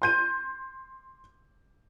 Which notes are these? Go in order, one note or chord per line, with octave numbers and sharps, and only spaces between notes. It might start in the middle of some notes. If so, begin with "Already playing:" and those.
C6 G6 D#7